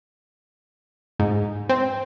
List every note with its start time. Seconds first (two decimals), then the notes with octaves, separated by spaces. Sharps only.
1.19 G#2
1.69 C4